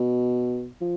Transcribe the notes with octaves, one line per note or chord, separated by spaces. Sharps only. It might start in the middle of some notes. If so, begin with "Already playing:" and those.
Already playing: B2
F3